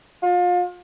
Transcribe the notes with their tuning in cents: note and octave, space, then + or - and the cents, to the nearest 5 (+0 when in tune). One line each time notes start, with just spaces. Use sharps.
F4 +30